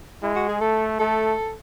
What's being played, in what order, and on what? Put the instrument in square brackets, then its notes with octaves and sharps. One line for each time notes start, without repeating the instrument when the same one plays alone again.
[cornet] G#3 [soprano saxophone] E4
[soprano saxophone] F#4
G#4
[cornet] A3 [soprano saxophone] A4
[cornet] A3 [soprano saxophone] A4